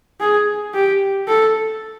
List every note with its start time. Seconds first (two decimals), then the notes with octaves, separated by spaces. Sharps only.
0.20 G#4
0.74 G4
1.28 A4